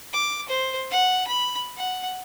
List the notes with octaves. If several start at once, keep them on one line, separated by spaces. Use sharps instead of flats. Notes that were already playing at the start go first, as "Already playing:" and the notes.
D6
C5
F#5
B5
F#5